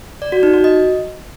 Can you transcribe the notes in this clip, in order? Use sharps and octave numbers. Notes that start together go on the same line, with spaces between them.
D5
F#4
D#4
F#4
D#5